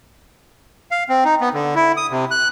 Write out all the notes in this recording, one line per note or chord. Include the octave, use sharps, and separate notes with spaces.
F5
C4
D#4
B3
D3
E4
D#6
C3
F#6